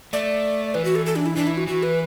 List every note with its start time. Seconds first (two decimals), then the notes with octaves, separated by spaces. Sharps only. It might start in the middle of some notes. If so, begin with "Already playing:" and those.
0.13 A3 D5
0.74 E3 B4
0.84 F#4
0.95 A4
1.06 A4
1.16 D4
1.26 E4
1.36 E3 D4
1.47 E4
1.57 F#4
1.67 E3 F#4
1.83 B4